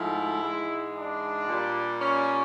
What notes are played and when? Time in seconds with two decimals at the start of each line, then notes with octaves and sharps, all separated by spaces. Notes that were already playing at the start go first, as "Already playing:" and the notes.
Already playing: G#2 F3 A3 E4
0.42 G#2 E3 G#3
0.94 D4
1.48 A#2 G3
2.00 C#4